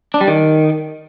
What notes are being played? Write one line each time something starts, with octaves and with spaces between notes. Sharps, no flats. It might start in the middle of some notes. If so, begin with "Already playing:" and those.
D4
G3
D#3